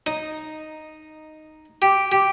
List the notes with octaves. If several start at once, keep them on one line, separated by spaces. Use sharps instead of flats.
D#4
G4
G4